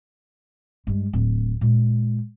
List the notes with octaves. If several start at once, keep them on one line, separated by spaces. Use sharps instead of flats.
G2 G#3
D1
A#2 G#3